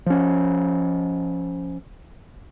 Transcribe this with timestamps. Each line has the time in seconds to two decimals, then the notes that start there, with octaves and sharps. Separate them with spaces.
0.06 F3 C#4